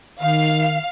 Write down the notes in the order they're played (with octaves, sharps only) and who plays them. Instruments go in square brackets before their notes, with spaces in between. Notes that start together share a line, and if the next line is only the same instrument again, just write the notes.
[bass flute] D#3 [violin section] F5